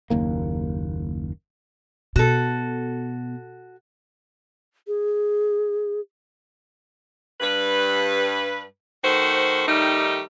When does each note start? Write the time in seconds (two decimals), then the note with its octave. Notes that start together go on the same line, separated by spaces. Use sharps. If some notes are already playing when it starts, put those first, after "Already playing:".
0.10 F#1 D#2 A#3
2.16 B2 F#4 A4
4.87 G#4
7.41 G2 B4
9.04 D#3 A3 F#4 C5
9.67 D#3 G3 A3 D#4 G4